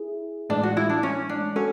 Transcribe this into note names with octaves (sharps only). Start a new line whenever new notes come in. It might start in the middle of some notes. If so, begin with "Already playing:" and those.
Already playing: E4 G#4
A2 E3 G#3 D4
F#4
E4
D4
C#4
D4
C#4 F#4 A4